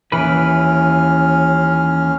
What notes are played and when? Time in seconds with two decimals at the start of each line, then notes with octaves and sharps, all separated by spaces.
0.12 D#2 E3 C#4 B4 F6